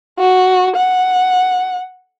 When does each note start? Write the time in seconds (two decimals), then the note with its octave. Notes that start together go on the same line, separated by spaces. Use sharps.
0.19 F#4
0.76 F#5